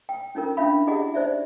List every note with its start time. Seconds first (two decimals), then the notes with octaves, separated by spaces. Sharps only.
0.09 G5
0.35 C#4 D#4 F4 A#4
0.57 C#4 D4 E4 E5 F5 B5
0.87 E4 G4 G#4 D#5 F#5
1.14 D#4 C5 D5 E5